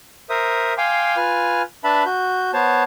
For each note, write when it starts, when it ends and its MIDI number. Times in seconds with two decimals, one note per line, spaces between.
0.30 0.73 70
0.30 0.73 72
0.30 0.73 76
0.30 0.73 87
0.78 1.16 77
0.78 1.16 79
0.78 1.16 80
0.78 1.16 84
0.78 1.16 86
1.16 1.62 65
1.16 1.62 71
1.16 1.62 80
1.16 1.62 89
1.84 2.03 62
1.84 2.03 71
1.84 2.03 76
1.84 2.03 81
1.84 2.03 83
2.06 2.51 66
2.06 2.51 91
2.53 2.83 59
2.53 2.83 72
2.53 2.83 73
2.53 2.83 81